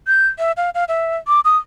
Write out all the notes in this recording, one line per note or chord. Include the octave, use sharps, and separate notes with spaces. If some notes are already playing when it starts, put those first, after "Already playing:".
G6
E5
F5
F5
E5
D6
D#6